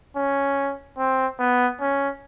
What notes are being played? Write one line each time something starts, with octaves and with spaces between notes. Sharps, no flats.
C#4
C4
B3
C#4